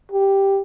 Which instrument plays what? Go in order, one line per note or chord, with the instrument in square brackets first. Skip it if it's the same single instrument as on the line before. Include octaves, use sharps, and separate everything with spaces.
[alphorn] G4